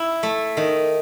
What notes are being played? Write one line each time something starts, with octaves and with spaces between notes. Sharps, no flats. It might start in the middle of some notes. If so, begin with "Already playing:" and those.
Already playing: E4
A3
D#3